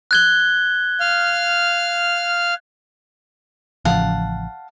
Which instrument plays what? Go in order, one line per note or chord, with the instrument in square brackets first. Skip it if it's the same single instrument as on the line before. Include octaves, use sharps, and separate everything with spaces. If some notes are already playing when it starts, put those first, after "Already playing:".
[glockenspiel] F#6 G#6 G7
[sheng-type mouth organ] F5 F6
[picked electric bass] A1 C#3 F3 [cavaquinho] F5 F#5 A5